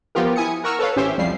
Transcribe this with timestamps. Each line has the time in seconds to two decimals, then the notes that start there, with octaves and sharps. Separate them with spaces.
0.15 F3 B3 F4 G4 A#4
0.36 E4 G#5 D#6 C#7
0.64 A#4 F#5 A#5 C#6 E6 F6
0.79 A4 B4 C#5 F5
0.96 A1 C#4 G4 C5 E5
1.17 C2 F2 F3 G3 C7